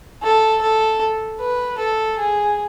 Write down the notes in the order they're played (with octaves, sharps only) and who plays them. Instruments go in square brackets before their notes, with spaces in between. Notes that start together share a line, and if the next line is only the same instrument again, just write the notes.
[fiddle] A4
A4
B4
A4
G#4